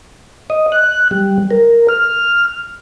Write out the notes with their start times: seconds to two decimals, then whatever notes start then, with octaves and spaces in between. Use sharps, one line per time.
0.50 D#5
0.72 F#6
1.11 G3
1.51 A#4
1.89 F6